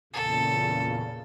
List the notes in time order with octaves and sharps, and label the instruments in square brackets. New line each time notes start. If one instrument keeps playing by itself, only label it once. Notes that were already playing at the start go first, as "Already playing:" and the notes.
[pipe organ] E2 A#2 C#3 [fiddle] A4